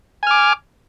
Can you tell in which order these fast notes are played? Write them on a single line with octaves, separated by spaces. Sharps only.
G#5 F6 D6